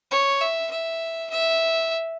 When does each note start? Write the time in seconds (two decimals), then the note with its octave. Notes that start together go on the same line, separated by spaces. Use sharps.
0.11 C#5
0.41 E5
0.71 E5
1.31 E5